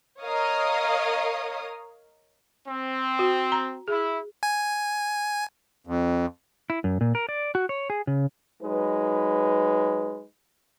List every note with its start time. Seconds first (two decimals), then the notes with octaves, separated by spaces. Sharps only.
0.21 A#4 C#5 D#5 F5 D#6
2.68 C4
3.19 F#4
3.52 A#5
3.88 E4 G#4
4.43 G#5
5.87 F2
6.70 E4
6.84 F#2
7.01 A#2
7.15 A#4
7.29 D5
7.55 F#4
7.69 C#5
7.90 G#4
8.07 C#3
8.62 F#3 G#3 D#4 B4